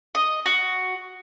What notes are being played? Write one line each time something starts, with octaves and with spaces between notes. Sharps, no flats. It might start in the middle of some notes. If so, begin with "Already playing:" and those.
D#5
F#4